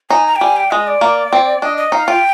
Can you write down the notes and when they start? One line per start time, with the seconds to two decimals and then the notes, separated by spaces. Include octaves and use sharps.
0.10 D#4 G#5
0.26 A#5
0.36 G5
0.41 G3 G#5
0.56 G5
0.71 G#3 D#5
0.87 D5
1.01 A#3
1.33 C4
1.62 D4 D#5
1.77 D#5
1.92 D#4 F5
2.08 F4 G5